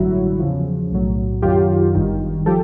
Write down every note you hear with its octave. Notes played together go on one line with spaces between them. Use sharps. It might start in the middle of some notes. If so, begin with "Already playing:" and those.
Already playing: A1 G2 D3 F#3 E4 F#4
E2 C#3 F3
B1 A2 F#3
F#2 D#3 F#3 F4 G4
G1 G2 D#3
F3 G4 A4